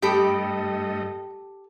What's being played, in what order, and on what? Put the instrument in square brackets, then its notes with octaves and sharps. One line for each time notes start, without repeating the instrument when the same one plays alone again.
[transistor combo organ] G2 A3 D#5 [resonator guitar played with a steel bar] G4 A4 [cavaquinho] G5 B5 D#6